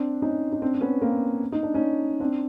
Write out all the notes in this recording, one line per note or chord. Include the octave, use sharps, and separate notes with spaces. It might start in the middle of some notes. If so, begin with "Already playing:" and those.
Already playing: C4 D4
C#4 D#4
D#4
C4 D4
C4
B3 C#4
A#3 C4
D#4
D4
C#4 D#4
C4 D4